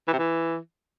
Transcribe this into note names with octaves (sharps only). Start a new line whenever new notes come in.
E3
C3
E3